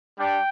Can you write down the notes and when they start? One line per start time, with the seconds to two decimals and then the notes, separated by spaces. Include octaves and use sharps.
0.18 G3 D4 G4 G5